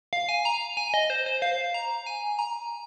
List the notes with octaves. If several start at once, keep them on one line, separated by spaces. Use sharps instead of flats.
F5
G#5
A#5
G#5
D#5
C5
C5
F5
A#5
G#5
A#5